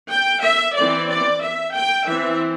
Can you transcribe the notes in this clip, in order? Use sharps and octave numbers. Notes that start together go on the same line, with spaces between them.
G5
E5
E3 C4 D5
D5
E5
G5
E3 C4 E5